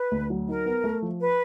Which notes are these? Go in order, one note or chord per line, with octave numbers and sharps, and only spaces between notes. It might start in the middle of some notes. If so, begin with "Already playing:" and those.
Already playing: B4
D2
F#3
D#4 A#4
B3
A3
F3
B4